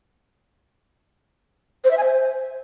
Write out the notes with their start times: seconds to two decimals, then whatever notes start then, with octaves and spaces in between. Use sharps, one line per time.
1.84 C5
1.91 E5
1.98 G#5
2.04 C5